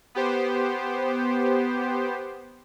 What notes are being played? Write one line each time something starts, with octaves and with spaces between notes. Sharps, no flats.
B3 G4 C5